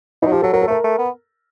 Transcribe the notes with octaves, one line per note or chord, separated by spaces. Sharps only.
E3 D#4
F#3
F3 G4
F#3 A4
F#3 A#4
A4
A3 A#4
A3
B3